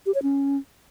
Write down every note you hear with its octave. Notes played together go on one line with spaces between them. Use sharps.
G4
C#5
C#4